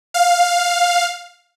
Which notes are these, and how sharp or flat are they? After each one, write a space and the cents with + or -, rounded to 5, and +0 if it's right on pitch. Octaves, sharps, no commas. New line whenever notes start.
F5 +10